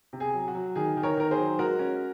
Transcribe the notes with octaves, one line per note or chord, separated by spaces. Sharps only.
C3
G#4
F#3
F#4
F#3
D#3 G#4
D#3
A#4 C#5
D#3 A#4
G#4 C5
F#3
G#3 F#4 A#4
C#4